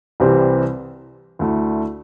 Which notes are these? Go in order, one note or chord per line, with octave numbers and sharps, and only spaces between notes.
C2 C3 E3 G3 C4
D2 D3 A3 E4